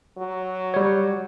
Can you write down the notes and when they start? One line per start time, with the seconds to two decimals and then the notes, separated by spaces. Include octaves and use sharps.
0.18 F#3
0.74 G3 C#5